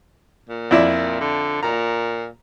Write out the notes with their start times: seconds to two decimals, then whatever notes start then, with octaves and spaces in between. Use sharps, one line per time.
0.49 A#2
0.71 F2 E4 D5
1.21 D3
1.63 A#2 A#5